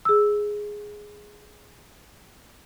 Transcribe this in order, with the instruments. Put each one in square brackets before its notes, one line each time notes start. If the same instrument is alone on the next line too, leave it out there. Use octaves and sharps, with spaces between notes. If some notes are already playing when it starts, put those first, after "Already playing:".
[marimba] G#4 E6